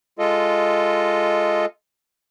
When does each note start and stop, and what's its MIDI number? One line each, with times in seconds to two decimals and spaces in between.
0.19 1.66 56
0.19 1.66 65
0.19 1.66 69
0.19 1.66 75